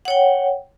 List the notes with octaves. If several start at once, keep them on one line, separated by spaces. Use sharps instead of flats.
C#5 F#5 G5